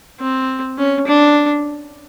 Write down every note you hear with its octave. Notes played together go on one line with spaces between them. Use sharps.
C4
C#4
D4